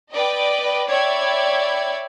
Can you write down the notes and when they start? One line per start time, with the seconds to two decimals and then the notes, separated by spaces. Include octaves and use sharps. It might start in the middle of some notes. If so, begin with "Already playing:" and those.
0.13 B4 D5 D#5 G5 D6
0.89 C#5 D5 E5 G5 B5 G#6